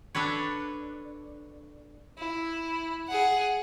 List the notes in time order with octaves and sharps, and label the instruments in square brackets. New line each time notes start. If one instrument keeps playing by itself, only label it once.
[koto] D4 A4 B4 C#5
[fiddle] E4
G#4 F#5